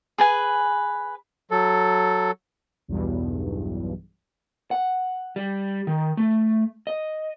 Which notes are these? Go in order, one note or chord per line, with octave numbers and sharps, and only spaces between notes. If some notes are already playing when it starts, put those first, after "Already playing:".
G#4 B4 G#5
F#3 A4
B1 E2 G2
F#5
G3
D#3
A3
D#5